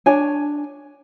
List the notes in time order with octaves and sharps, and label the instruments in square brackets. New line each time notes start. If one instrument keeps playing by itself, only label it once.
[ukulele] D4 C#5 G#5